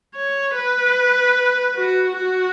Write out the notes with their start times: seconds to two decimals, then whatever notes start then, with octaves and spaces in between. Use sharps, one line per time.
0.16 C#5
0.56 B4
1.76 F#4
2.17 F#4